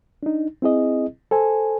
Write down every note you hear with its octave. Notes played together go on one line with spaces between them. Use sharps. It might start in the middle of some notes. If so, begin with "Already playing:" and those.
D4 D#4
C4 E4 G#4 D#5
A4 C5 G#5